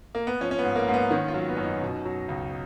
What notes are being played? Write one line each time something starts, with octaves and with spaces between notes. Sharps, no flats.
A#3
B3
F3 C#4
C#4
G#2 B3
A#3
G#2
B3
D#3 C#4
F4
F#3
B3
F#2 C#4
D#4
B2
F#3
C#2